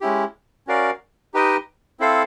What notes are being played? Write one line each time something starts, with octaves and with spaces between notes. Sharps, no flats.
G#3 C#4 E4 G4
C#4 F#4 A#4 D5 F5
D#4 G4 B4 D#5 G5
C4 E4 A4 C5 F5